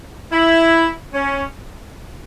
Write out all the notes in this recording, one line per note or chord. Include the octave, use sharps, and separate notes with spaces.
E4
C#4